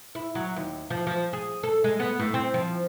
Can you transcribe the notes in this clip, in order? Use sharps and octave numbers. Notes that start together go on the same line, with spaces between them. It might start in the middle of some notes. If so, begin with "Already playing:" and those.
E4
F#3
D#2
F3
F3
G#4
A4
G#3
B3
A2
C4
F3